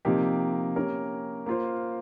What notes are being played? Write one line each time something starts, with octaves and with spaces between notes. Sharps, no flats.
C3 F3 A#3 D#4 G4
A#3 C#4 G4 A#4 C#5
A#3 F4 C5